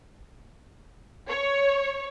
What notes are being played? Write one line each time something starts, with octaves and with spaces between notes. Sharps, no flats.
C#5